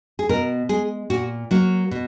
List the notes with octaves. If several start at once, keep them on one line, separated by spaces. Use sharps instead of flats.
G#4
B2 A#4
G#3 G#4
A#2 F#4
F#3 A#3 F#4
B2